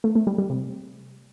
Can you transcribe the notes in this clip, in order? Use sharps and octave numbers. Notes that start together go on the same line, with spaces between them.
A3
A3
G3
G3
C3